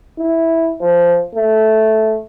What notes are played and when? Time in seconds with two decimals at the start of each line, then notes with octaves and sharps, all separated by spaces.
0.19 E4
0.81 F3
1.35 A3